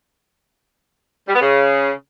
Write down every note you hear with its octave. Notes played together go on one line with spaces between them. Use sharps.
G3
B3
C#3